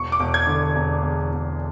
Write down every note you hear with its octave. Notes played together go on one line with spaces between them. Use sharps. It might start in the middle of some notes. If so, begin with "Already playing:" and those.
Already playing: E1 C#6
D6
E1
G#6
D3
E1
E2
E1